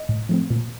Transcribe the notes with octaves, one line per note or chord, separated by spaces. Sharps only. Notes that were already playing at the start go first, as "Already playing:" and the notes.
Already playing: D#5
A2
F3 A3 C4
A#2